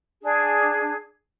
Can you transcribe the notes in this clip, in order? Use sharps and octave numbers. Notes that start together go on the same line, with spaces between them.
D4 G#4